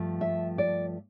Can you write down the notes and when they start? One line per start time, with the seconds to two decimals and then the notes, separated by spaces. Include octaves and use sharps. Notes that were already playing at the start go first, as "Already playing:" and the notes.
Already playing: G2 F3 A3
0.21 E5
0.58 D5